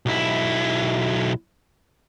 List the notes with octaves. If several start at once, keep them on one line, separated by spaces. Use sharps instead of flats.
B1 E4